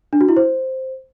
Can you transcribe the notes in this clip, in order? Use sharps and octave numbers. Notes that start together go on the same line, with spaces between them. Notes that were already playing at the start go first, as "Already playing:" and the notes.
D4
F#4
E4
C5